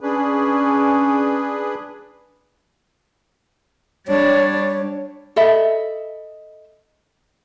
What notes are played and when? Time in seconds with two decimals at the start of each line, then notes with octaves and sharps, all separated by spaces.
0.01 C#4 D4 G#4 B4
4.08 G3 D4 C#5
5.36 A4 D#5 E5 B5